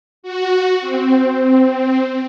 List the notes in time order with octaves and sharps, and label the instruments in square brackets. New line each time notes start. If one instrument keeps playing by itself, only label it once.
[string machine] F#4
C4